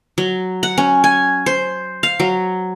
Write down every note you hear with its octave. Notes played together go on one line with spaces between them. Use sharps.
F#3
F#5
C#4
G#5
C5
F5
F#3